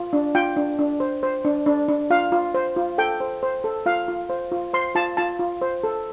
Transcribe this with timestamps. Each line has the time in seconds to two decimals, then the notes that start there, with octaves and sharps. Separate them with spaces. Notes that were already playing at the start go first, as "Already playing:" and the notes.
Already playing: F4
0.13 D4
0.35 F4 G5
0.57 D4
0.79 D4
1.00 C5
1.23 C5
1.45 D4
1.66 D4
1.88 D4
2.10 F4 F5
2.32 F4
2.54 C5
2.76 F4
2.98 A4 G5
3.20 C5
3.43 C5
3.64 A4
3.86 F4 F5
4.08 F4
4.30 C5
4.52 F4
4.73 C5 C6
4.95 F4 A5
5.17 F4 A5
5.39 F4
5.62 C5
5.84 A4